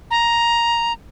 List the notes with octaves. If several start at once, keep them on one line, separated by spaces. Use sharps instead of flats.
A#5